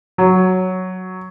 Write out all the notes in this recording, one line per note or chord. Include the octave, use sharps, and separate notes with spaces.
F#3